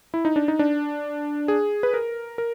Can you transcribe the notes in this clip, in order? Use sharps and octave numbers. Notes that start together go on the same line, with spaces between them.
E4
D#4
D4
D#4
D4
G#4
B4
A#4
A#4